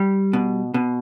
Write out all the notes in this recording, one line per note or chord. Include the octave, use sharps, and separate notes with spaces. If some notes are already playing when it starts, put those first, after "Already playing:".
Already playing: G3
B2
B2